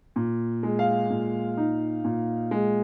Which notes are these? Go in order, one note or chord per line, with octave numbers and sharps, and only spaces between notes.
A#2
G#3
F5
A#2
D#4
A#2
G#3